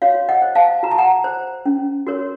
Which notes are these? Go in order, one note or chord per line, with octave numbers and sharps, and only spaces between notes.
F#4 C#5 F5
D#5 F#5
C5
F5 A5
F#4 A#5
A5
F#5 A#5
C5
C#4
F#4 A#4 C#5